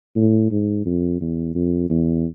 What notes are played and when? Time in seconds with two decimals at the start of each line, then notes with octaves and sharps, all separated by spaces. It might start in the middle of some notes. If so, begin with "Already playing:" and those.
0.16 A2
0.51 G#2
0.85 F2
1.21 E2
1.55 F2
1.90 E2